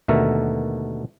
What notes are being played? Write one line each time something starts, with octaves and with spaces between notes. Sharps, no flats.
D#2 B2 D3 A3 A#4 E5